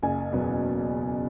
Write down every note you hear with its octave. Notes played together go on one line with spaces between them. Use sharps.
F#1 G#5
E2 B2 F#3 B3